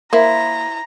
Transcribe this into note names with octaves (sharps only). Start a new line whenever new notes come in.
A#3 E4 C5 A#5